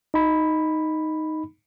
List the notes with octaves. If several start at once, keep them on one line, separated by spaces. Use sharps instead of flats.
D#4 B5